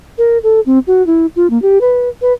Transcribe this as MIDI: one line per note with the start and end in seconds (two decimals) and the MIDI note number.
0.18 0.38 70
0.43 0.60 69
0.66 0.79 60
0.87 1.05 66
1.07 1.26 64
1.36 1.50 65
1.50 1.60 58
1.62 1.79 67
1.81 2.09 71
2.22 2.33 71